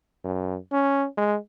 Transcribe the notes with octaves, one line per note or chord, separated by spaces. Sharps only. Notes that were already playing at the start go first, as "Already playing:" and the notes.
F#2
C#4
G#3